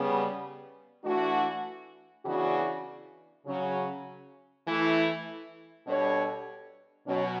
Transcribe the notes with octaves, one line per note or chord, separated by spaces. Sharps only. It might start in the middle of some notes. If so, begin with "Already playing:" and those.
Already playing: C#3 G3 B3
E3 A3 D4 F#4
C#3 E3 B3 D4 F#4
C#3 F#3 C#4
E3 A3 E4
B2 G3 D4 A4 C#5
B2 F#3 C#4